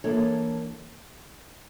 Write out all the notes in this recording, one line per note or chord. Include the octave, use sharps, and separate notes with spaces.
E3 A#3 D4 A4 C#5